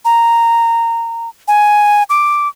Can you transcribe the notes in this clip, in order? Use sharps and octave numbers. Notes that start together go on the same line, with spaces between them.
A#5
G#5
D6